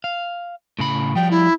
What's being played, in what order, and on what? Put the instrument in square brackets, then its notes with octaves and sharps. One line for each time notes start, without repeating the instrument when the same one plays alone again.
[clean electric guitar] F5
A2 C#3 B5
[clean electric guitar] F3 G3 [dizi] G5
[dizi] E4